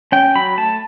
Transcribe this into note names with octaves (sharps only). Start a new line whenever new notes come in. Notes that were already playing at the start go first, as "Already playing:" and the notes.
C#4 G5
F#3 B5
A3 A5